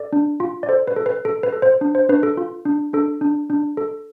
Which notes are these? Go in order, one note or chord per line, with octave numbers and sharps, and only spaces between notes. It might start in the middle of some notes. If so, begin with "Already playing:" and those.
Already playing: A4 D5
D4
F4
D5
A4 C5
B4
A4
B4
A4
B4
A4
C5
D4
C5
D4 B4
A4
F4
D4
D4 A4
D4
D4
A4